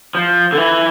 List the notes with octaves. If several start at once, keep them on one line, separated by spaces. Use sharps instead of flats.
F3
D3
E3